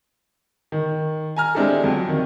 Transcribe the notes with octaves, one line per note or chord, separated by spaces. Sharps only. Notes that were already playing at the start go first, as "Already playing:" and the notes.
D#3
G#5 A#5 F6
G#3 C4 D4 E4 G4 A4
F2 F#3
D#3